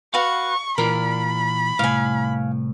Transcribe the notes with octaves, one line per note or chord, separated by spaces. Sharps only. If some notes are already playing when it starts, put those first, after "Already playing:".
F#4 B4 F5 F#5 C#6
A#2 E3 F4 A#4 B5
C2 A2 F5 G#5